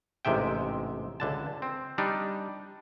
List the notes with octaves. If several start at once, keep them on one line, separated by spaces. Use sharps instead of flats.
A1 G#2 C3 E5 G5
C#2 D3 A5
C4
G3 D4 D#4